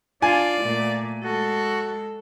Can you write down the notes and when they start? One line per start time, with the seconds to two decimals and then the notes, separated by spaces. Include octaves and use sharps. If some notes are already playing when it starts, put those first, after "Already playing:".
0.22 D4 F4 D5 G#5
0.62 A#2 A3
1.24 G#3 F#4 A4